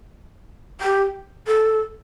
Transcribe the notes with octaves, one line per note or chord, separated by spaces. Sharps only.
G4
A4